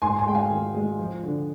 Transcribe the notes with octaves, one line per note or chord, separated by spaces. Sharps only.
G#2 G#5 C6
G#5 C6
G#3 G5
F5 G#5
D#3
G#3
F3
D3